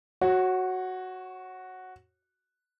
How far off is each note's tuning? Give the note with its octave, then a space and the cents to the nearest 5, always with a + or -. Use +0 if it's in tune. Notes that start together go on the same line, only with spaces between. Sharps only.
F#4 +0 C#5 -30